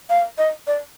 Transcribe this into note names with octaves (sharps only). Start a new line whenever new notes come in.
F5
D#5
D5